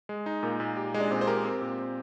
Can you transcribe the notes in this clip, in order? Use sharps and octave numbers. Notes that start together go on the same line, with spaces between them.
G#3
D#4
A#2 A#3
A#2
G4
G#3
D4
A#2 C4
C5
G4 A#4
C4
A#2
C4